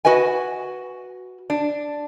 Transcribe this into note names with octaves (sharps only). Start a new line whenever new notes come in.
F#4 B4 D#5 G#5
D4